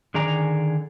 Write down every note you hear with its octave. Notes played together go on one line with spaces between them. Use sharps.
D3 D#3 G#4 D5 G#5 A#5